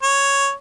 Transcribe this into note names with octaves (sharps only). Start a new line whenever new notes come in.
C#5